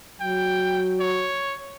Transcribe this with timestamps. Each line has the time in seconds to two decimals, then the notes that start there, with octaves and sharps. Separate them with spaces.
0.21 F#3 G5
1.00 C#5